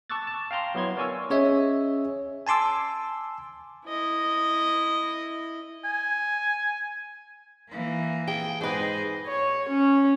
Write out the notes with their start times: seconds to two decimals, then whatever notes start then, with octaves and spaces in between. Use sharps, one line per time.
0.10 A5 C#6 D6 E6 F#6 A6
0.27 A5
0.51 F5 G5 A#5 C6
0.75 F#3 B3 E4 C6 G#6
0.97 A#4 C#5 D5 G#5 C#6 E6
1.30 C#4 G#4 C#5 D#5 E5
2.47 G#5 A5 C6 D6 E6
3.86 E4 D#5
5.85 G#5
7.70 E3 A#3
8.28 G#4 G5
8.61 G#2 G#4 B4 C5 D#5
9.27 C#5
9.68 C#4